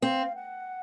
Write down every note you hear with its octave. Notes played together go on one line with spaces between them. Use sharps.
C4 F5
F#5